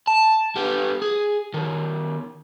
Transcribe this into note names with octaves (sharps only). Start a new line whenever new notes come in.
A5
G3 B3
G#4
D#3 B3